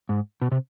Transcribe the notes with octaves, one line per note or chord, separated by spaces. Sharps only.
G#2
B2
C3